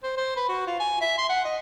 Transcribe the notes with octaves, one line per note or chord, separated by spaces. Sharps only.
C5
C5
B4
F#4
F4
G#5
E5
C6
F#5
D#5